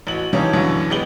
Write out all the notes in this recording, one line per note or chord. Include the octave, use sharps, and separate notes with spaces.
A1 F#4 F#7
C#3 E3 F3 C#4 D#4 G4
F#2 B2 D3 E3 F#3
A1 G#3 B3 G4 F#7 G7